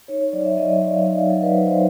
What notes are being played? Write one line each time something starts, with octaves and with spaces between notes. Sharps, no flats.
D#4 C#5
C#5
F#3 D5
E5
F#3 D#5
D5
F#3 D#5
F5
D#4
F5
F#3
B4
D#4 C5
C5